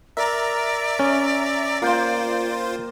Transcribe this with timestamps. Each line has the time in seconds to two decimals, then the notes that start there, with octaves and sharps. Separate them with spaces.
0.17 A#4 D5 E5 A#5
0.99 C#4
1.82 A#3 F4 C5 G5 C6